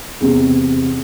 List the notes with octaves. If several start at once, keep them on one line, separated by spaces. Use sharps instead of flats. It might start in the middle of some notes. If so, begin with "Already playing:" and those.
E2 C3